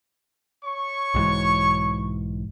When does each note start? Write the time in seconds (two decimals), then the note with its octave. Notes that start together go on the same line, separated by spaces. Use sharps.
0.64 C#5 C#6
1.14 B1 G#2 E3